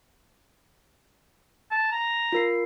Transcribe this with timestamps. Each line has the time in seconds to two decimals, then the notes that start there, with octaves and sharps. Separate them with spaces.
1.71 A5
1.91 A#5
2.32 F4 A#4 C7